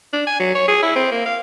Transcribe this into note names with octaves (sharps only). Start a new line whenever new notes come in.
D4
G#5
F#3
C#5
G#4
E4
C4
A#3
F5